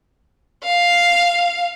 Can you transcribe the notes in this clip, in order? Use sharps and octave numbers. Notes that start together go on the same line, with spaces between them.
F5